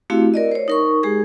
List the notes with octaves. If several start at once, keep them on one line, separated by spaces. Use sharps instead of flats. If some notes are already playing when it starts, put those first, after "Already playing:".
A3 C4 E4 F#4 G4 F5
A#4 D5 D#5
C5 C#5
D#4 A#4 C#6
G#3 G4 G#4